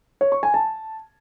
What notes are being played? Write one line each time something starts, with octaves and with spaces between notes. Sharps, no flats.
C#5
C#6
G#5
A5